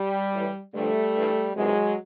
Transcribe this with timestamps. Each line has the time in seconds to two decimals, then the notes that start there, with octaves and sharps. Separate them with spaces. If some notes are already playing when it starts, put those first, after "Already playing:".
Already playing: G3
0.33 A2 E3
0.73 G2 D3 F3 G3 A3
1.14 G2 E3
1.55 E2 C3 D#3 F#3 G#3